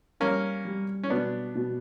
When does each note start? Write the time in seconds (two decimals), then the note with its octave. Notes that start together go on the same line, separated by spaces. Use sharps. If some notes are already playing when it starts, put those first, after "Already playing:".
0.20 G3 A#3 C#4
0.65 G3
1.03 C#4
1.10 B2 B3 D4
1.55 B2